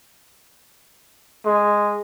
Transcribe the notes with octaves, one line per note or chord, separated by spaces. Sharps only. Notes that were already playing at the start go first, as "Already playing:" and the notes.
G#3